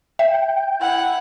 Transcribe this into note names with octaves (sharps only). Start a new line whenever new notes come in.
E5 G5
E4 F#5